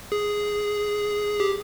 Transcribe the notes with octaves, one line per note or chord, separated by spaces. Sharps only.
G#4
G4